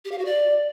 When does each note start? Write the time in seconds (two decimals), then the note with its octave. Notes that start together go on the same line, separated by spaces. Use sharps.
0.05 G4
0.12 F5
0.18 F#4
0.25 D5